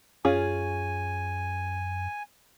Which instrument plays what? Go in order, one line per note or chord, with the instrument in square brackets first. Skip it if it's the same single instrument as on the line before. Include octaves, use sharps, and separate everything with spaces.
[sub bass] F#2 [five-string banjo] C#4 F4 G#4 [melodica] G#5